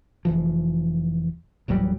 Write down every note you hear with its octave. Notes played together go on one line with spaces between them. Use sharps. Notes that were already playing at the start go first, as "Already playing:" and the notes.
F1 E3 F3
D#1 A1 F#3 G3